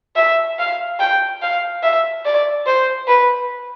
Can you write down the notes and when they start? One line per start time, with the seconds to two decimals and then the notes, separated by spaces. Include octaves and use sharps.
0.16 E5
0.59 F5
1.00 G5
1.42 F5
1.83 E5
2.25 D5
2.66 C5
3.08 B4